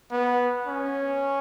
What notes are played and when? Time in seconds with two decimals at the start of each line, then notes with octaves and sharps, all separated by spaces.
0.11 B3
0.67 C#4